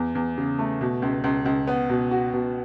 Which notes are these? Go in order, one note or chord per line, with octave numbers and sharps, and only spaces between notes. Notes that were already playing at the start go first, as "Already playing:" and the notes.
Already playing: E2
E2
C#3
A3
B2
C#2
C#2
C#2
B3
B2
F#4
B2